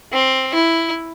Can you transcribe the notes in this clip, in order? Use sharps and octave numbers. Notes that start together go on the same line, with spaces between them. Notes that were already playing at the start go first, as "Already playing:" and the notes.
C4
E4